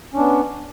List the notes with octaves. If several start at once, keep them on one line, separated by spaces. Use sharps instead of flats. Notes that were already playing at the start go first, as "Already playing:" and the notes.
B3 C#4 D4